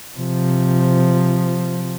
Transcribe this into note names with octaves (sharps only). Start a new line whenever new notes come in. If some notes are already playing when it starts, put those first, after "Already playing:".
C3 F3